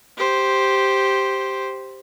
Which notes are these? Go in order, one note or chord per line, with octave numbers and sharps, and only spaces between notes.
G4 C5